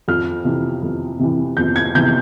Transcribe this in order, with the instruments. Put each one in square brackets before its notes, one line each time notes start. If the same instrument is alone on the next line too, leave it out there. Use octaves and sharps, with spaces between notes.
[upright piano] F2 F6
C3 E3
F2
C3 E3
F2 G6
G#6
C3 E3 G6